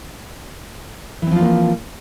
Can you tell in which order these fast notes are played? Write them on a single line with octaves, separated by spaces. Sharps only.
E3 C4 F3 F4 A#3